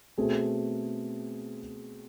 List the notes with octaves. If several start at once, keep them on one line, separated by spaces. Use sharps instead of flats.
B2 A3 C4 G#4